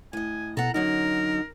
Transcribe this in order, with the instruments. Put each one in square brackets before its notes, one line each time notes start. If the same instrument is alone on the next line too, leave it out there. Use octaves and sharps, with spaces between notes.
[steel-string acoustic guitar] A2 D#5 [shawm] G#5
[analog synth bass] B2 [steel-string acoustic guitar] A4 F#5 [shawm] A#5
[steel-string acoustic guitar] F#2 D3 F#3 [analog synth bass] D#4 [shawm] A#4